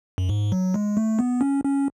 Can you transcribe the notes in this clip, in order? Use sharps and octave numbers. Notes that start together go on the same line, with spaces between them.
F#2
G#2
F#3
G#3
A3
B3
C#4
C#4